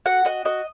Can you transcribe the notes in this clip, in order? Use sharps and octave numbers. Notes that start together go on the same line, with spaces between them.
F#4 F#5
F#4 D#5
F#4 D#5